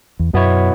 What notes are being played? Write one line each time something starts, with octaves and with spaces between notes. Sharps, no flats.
E2
F#2 B2 B3 E4 C#5